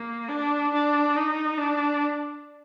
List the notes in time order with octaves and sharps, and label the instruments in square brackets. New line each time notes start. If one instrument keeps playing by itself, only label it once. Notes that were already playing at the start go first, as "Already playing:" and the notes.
Already playing: [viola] A#3
D4
D4
D#4
D4